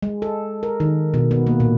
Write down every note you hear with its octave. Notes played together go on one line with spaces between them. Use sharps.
G#3
A4
A#4
D#3
B2
B3
A#3
A#2